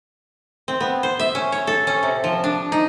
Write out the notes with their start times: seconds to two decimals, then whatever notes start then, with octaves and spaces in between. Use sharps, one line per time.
0.68 C4
0.81 B3
1.03 C5
1.19 E5
1.35 C#4
1.52 C#5
1.67 A4
1.87 C#4
2.03 C3
2.24 F3
2.44 D4
2.72 D#4